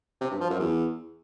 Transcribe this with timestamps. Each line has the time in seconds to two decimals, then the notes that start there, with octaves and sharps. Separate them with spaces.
0.21 C3
0.31 G2
0.41 F3
0.50 F#2
0.60 E2